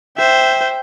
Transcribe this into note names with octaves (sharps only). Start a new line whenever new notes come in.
C5 E5 G5